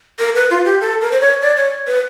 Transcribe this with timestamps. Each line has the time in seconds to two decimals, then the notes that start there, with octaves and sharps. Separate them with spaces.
0.19 A#4
0.35 B4
0.50 F4
0.65 G4
0.81 A4
1.01 A#4
1.11 C5
1.21 C#5
1.42 D5
1.57 C#5
1.87 B4